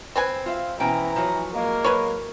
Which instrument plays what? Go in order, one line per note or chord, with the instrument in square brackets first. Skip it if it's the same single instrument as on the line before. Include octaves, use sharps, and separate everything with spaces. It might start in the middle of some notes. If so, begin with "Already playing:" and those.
[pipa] C4 B4 G#5
[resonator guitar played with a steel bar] F4 E5 F5
[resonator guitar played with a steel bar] B2 C#4 G5 [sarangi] E3 [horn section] A#5
[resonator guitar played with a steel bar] F3 F#3
[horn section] G#3 A#3 [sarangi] A#4
[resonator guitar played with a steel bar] F#3 [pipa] B4 C#5